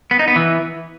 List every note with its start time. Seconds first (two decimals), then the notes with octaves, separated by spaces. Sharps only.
0.11 B3
0.19 D#4
0.28 B3
0.36 E3